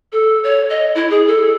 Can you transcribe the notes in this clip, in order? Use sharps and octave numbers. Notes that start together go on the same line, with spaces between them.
A4
C#5
D#5
E4
G#4
A4